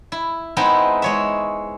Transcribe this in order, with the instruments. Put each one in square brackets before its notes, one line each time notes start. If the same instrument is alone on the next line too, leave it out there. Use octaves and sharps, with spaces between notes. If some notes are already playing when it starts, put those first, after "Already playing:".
[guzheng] E4
G#3 B3 C4 D#4 E4
G#3 C#5 E5